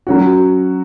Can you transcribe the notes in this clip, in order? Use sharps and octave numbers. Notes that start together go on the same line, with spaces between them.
F#3 C#4 F#4